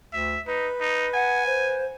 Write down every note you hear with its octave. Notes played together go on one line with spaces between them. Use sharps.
D2 E5
D#4 B4
D#4
F#5 G#5
C5